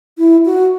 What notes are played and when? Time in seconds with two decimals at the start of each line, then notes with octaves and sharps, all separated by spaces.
0.18 E4
0.45 F#4